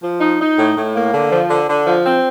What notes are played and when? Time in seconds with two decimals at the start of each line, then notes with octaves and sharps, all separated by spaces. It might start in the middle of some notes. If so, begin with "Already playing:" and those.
0.03 F3
0.20 D#4
0.40 D#4
0.58 A2
0.76 A2
0.95 A#3
1.13 D3
1.31 F3
1.50 D3
1.69 D3
1.86 F3
2.05 C4